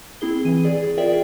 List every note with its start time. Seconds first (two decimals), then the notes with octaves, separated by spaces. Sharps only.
0.21 C4 E4 G#4 G7
0.45 E3 D#7
0.64 G#4 D5
0.97 F4 G#4 A#4 D5 E5 G5